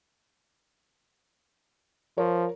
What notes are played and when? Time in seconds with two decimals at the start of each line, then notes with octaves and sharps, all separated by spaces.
2.18 F3 A#4 C#5